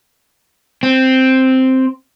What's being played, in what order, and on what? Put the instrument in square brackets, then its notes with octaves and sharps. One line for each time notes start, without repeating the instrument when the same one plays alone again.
[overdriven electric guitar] C4